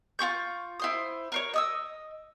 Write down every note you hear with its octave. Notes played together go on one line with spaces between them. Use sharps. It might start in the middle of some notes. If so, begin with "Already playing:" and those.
F4 F#4 C#6 G6
E4 C5 D#6
A#4 C5 C#5
D#5 D#6 E6